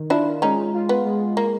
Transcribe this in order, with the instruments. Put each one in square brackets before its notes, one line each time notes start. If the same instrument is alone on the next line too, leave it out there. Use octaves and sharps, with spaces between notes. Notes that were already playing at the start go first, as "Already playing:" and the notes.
Already playing: [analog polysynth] D#3
[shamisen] D4 E4 [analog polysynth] F4
[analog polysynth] G#3 [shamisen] C#4 D#4
[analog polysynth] F4
[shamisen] B3
[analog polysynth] G#3
[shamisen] A#3